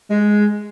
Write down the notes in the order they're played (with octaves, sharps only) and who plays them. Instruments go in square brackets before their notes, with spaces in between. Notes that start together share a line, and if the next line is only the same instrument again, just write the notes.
[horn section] G#3